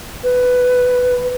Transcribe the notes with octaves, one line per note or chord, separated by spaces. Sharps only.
B4